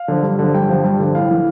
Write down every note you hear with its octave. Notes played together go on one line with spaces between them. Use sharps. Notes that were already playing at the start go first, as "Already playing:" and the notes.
Already playing: F5
D3 F3
G2
D3 F3
G2 G5
D3 F3
G2
D3 F3
A2 F5
E3